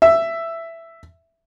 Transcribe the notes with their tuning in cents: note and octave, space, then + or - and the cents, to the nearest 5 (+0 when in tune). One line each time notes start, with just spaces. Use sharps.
E5 +10